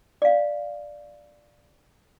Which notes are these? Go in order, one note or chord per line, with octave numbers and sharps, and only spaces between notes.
D5 F5